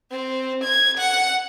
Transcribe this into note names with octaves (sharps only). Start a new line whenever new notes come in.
C4
G#6
F#5